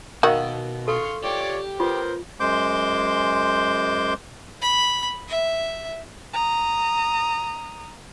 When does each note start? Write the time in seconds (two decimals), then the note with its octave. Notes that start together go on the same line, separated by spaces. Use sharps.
0.23 B2 D#3 F#4 A#4 D#5 F5
0.88 A4 F5 C6 C#6
1.24 F4 G4 C#5 D5
1.80 B3 F4 A#4 C5
2.40 F#2 G#3 C5 C6 D6 G6
4.62 B5
5.28 E5
6.33 A#5 D#6